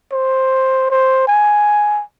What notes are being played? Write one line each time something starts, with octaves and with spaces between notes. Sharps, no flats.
C5
C5
G#5